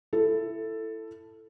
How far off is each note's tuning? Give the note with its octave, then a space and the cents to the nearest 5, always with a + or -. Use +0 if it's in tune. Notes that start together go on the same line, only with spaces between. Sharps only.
E4 +15 A4 +5